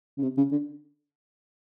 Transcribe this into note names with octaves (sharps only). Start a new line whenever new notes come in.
C#3
C3
C#3
D3